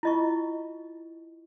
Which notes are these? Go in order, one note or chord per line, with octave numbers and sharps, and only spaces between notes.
E4 F4 D#5 A5 C#6